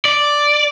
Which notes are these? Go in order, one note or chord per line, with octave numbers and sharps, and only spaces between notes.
D5